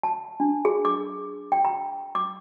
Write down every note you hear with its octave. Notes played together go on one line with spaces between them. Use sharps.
A5
D4
G#4
D6
G5
A#5
D6